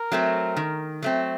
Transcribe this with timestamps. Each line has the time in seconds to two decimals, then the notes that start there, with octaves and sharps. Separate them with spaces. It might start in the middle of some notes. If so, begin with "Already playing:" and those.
Already playing: A#4
0.12 F#3 A3 C4
0.57 D#3
1.03 F#3 A3 C4